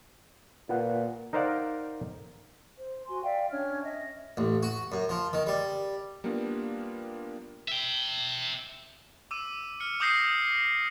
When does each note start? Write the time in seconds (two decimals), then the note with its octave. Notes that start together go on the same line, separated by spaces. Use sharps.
0.69 A#2 F4 B4 F#5
1.33 D#4 A#4 C5 D5 F5 F#5
2.78 C5
3.07 F#4 G#5 C6
3.23 D5 E5 F5 G5
3.51 C#4 D4 C#5 F6
3.83 D#5 E5
4.37 A1
4.63 F#4
4.92 F#2
5.09 F3
5.33 D#3
5.47 G3
6.24 G3 A#3 B3 D4 F4
7.68 E5 G5
9.31 D6 E6 D#7
9.80 F6 C#7
10.00 D6 D#6 G6 A#6 C7 D#7